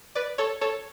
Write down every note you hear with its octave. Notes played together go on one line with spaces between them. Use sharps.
B4 D5
A4 C#5
A4 C#5